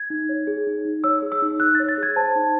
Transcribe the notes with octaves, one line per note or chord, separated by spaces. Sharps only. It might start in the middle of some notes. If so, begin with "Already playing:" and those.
Already playing: G#6
D#4
C#5
G#4
D#4
D#4
C#5 E6
G#4
E6
D#4
D#4 F#6
A6
C#5
A6
G#4
G#6
C5 A5
D#4